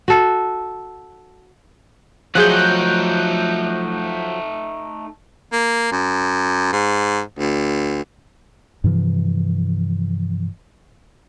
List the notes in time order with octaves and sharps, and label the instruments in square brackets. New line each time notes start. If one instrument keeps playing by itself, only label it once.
[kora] F#4 A4
[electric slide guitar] F3 F#3 [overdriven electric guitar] A3 D#4 [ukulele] F4 G#4 [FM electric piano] F#6 G6
[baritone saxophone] A#3
F#2
G#2
D2
[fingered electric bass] G2 C3 E3 F3